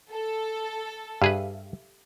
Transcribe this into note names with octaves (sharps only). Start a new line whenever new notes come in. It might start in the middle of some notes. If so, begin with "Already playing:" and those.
A4
G2 G4 G#4 B4 E5 F5